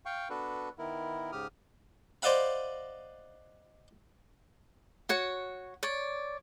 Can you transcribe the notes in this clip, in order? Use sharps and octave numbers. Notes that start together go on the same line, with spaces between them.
F5 G5 C#6
B3 D4 F#4 A4 B4
D#3 B3 E4 A#4
G#2 C#3 G4 D#6 F6
C5 D5 D#5 F5 F#5 B5
F#4 C#5 F#5
C#5 D5